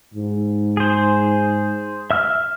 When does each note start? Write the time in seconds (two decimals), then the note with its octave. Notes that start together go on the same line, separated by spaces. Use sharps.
0.14 G#2
0.77 G#4 C5
2.11 E5 E6 F6